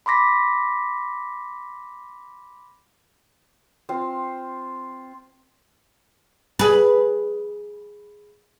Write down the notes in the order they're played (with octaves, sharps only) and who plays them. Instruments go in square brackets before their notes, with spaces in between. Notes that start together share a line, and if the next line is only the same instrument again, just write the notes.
[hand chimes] B5 C6 D6 A#6 B6
[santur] C4 F4 C5 F5
[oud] G#4 B4